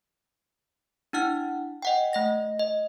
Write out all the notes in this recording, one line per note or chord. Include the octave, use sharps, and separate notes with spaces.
D4 E4 F#5 F6
D#5 F#5 G5
A3 D#5 A#6
D#5